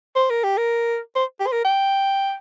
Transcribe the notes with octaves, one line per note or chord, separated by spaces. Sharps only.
C5
A#4
G4
A#4
C5
G4
C5
A#4
G5